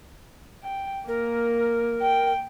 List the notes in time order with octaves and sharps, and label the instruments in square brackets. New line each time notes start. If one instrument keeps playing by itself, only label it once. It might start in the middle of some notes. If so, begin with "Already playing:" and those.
[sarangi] G5
[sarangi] A#3 [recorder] A#4
[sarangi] G5